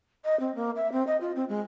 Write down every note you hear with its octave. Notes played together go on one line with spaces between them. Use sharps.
D#5
C4
A#3
E5
C4
D#5
F4
C4
G#3